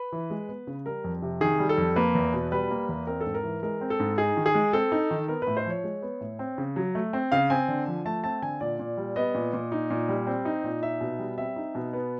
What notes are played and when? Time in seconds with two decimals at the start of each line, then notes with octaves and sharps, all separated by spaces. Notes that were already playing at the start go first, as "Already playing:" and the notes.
Already playing: B4
0.12 E3
0.30 G#3
0.49 B3
0.67 C#3
0.86 G3 A#4
1.04 F2
1.22 C3
1.41 D#3 G#4
1.60 G3
1.69 A4
1.78 F2
1.96 A#3 B4
2.15 E2
2.33 B2
2.52 G3 B4
2.71 A#3
2.89 E2
3.07 C4 A#4
3.21 A4
3.26 G#2
3.34 A#4
3.44 E3
3.63 G#3 A#4
3.81 C4
3.90 A4
4.00 G#2
4.18 D#4 G#4
4.37 D#3
4.46 G#4
4.54 G#3
4.73 C4 A4
4.92 D#4
5.11 D#3
5.28 B3 A#4
5.42 B4
5.47 A2
5.57 C5
5.66 F3 C#5
5.84 G#3
6.02 B3
6.21 A2
6.39 C4
6.58 C#3
6.76 F#3
6.95 A3
7.13 C4
7.32 C#3 F5
7.50 C4 G#5
7.68 D3
7.87 F3
8.05 A3 A5
8.24 C4 A5
8.42 D3 G#5
8.61 A#2 D5
8.79 A#2
8.97 G3
9.16 B3 D#5
9.35 A#2
9.53 A#2
9.72 D#4
9.90 A#2
10.09 G3
10.27 C4
10.45 D#4
10.64 A#2
10.82 D#4 E5
11.01 B2
11.19 G3
11.38 C4 E5
11.56 D#4
11.75 B2
11.93 B3